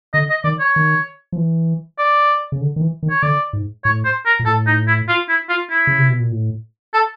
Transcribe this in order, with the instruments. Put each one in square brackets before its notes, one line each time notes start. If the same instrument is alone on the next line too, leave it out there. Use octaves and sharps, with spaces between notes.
[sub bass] D3 [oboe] D#5
[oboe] D#5
[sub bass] D#3 [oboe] D5
[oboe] C#5
[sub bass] D#3
F3
E3
[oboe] D5
[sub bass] C#3
D3
D#3
E3
D#3
[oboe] C#5
[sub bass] D3 [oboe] D5
[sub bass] G#2
[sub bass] A2 [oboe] C#5
[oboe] C5
A#4
[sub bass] A#2
[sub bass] A2 [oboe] A4
[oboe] D#4
E4
F4
E4
F4
E4
[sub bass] C#3
C3
B2
A#2
A2
[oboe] A4